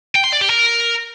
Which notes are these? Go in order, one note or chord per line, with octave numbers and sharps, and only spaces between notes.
G5
C6
D5
G4
A#4